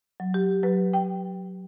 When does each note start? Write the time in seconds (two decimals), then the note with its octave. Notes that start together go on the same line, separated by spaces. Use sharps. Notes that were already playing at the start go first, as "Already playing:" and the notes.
0.20 F#3
0.34 G4
0.63 F#3 B4
0.93 G5